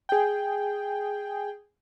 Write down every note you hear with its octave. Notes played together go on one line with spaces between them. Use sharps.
G#4 G5